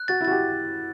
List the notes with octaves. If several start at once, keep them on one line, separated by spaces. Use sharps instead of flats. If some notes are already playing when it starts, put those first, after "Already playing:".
Already playing: F#6
F#4 A6
E4
F#4 A6
G4